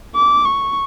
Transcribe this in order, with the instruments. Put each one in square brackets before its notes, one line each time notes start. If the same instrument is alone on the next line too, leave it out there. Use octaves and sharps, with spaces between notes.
[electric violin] D6
C#6